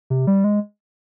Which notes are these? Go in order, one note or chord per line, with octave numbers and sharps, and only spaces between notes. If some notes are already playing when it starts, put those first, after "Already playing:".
C3
G3
G#3